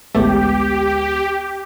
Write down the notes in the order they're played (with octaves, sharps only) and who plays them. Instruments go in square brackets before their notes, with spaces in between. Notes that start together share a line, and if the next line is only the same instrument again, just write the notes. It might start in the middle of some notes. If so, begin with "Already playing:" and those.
[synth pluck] A1 A3 [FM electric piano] D2 G#3 B3 [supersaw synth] G4